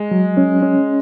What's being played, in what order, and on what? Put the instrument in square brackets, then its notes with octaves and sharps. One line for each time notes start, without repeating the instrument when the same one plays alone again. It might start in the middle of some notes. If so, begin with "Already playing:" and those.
Already playing: [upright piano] G#3
[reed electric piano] F#3
C#4
C#4